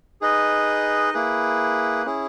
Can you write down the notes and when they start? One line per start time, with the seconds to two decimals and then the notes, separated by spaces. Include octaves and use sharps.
0.21 D#4 G#4 B4 D#5
1.14 A#3 E4 G#4 B4
2.06 C#4 E4 G#4